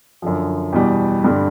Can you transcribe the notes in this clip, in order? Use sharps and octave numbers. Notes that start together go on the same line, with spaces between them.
F#2 D3 F3
E2 B2 G3
G2 D3 G3